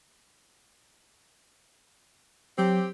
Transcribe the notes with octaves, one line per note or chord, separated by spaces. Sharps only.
F#3 C4 G4